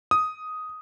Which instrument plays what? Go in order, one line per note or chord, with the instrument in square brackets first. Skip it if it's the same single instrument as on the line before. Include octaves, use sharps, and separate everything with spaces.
[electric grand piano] D#6